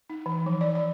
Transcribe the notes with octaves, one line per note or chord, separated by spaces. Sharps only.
D#4
E3
F3
D5
D5